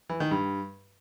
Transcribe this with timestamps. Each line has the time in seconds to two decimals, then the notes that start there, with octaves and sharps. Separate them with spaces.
0.09 E3
0.20 D#3
0.31 G2